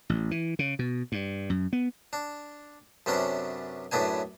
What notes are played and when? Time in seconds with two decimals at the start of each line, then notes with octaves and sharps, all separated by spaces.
0.09 A1
0.31 E3
0.59 C#3
0.79 B2
1.12 G2
1.50 F#2
1.73 B3
2.13 D4
3.06 F#2 C3 B3 C#4 D4
3.91 F#2 A2 B3 D4 G#5